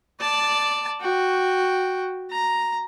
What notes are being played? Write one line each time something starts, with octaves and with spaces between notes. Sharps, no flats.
D5 A5
F#4 G5
A#5